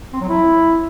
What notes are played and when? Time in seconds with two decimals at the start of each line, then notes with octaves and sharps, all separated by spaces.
0.13 C4
0.21 F#3
0.29 E4